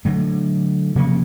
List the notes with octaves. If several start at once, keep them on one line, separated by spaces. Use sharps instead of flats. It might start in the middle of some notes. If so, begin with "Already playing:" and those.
D3 F#3 A3
C3 F3 A#3 C#4